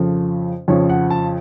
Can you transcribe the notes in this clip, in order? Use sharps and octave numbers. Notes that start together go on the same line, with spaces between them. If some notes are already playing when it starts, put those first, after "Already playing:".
Already playing: F2 C#3 F3 A4
F2 C#3 F3 C#5
F#5
A5